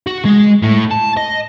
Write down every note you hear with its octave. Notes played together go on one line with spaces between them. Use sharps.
F#4
G#3
A2
A5
D#5